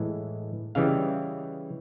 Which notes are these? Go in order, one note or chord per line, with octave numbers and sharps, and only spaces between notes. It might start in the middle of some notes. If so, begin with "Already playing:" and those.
Already playing: A2 E3 G#3
C#3 E3 G3 D#5 F5